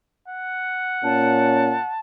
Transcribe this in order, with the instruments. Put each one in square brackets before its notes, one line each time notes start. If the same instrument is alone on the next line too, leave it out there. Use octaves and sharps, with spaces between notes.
[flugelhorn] F#5
[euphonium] A#2 [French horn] C#4 [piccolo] A5